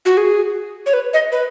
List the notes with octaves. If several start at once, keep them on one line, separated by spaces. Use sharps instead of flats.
F#4
G#4
C#5
B4
D#5
B4